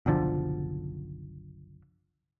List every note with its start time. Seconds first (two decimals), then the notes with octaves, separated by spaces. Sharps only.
0.06 F#1 B1 D3 F3